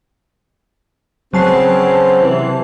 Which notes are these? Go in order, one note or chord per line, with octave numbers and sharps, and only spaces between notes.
C#3 F#3 B3 C4 A5 C7
C3 E3